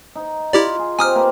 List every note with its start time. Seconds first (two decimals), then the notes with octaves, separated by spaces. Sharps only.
0.16 D#4
0.53 E4 F4 G4 D5
0.79 G#4
0.99 C4 G4 G#5 A#5 D#6 F6
1.15 A#3 B4 F5